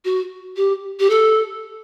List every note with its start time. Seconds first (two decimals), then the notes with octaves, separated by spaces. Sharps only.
0.05 F#4
0.56 G4
0.99 G4
1.10 A4